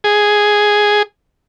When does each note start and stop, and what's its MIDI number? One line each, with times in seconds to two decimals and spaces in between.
0.04 1.02 68